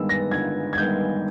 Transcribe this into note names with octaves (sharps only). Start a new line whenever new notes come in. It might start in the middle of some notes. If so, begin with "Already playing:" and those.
Already playing: G1 G2 D#3 G#3 B3 E6
A#6
G1 G#6
G#6
G2 D#3 G#3 B3 G6